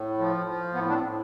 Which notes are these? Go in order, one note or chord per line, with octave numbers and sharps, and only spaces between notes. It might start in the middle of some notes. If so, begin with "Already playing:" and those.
Already playing: A2
F3
F3
A2 B3
D4
C4
A2